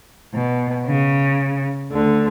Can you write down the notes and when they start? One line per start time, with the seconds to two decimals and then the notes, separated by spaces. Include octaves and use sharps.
0.33 B2
0.85 C#3
1.90 D2 D3